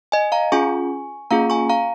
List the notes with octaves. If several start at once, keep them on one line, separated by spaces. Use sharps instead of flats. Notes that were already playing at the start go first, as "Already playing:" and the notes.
D#5 G#5
F5 A#5
C#4 F4 G#4 G#5 C#6
A#3 C#4 F4 G#4 F5 A#5
G#5 C#6
F5 A#5